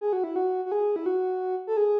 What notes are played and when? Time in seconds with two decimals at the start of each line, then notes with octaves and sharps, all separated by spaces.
0.01 G#4
0.13 F#4
0.24 E4
0.36 F#4
0.66 F#4
0.72 G#4
0.96 E4
1.06 F#4
1.67 A4
1.77 G#4